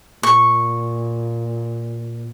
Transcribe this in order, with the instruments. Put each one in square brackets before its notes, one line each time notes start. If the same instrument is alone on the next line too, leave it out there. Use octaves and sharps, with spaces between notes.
[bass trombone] A#2 [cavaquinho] C#6